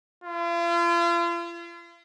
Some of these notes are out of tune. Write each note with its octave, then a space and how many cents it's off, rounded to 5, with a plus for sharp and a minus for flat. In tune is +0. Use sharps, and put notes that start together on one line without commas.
F4 -40